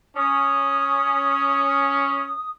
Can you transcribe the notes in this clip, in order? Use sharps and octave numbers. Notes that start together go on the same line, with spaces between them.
C#4 D#6